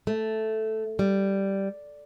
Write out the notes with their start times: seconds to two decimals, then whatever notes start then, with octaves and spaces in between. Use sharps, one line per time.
0.07 A3
0.99 G3